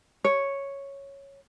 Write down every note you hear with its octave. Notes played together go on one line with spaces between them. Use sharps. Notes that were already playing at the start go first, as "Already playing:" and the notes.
C#5